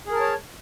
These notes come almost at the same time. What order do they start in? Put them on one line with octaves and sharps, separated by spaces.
G#4 A#4 A5 C#5